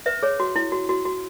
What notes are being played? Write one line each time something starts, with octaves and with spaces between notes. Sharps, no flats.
B4 E5
G#4 C#5
F#4
E4
F#4
F#4
F#4